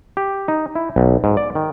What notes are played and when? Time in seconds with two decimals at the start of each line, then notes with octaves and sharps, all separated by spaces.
0.17 G4
0.48 D#4
0.75 E4
0.96 B1
1.24 G#2
1.37 D5
1.55 D#3